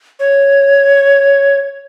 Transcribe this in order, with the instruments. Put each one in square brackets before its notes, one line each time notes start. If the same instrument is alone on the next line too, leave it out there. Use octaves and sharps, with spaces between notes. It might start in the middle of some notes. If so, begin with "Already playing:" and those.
[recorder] C#5